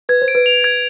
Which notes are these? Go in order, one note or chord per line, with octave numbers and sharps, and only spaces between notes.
B4 G#6
C5
D7
B4
F7
G#6